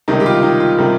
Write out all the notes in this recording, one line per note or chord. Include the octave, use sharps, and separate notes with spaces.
C#2 C3 D#3 G3 D#4
G4
F4
D#4
F4
C3 D#3 G3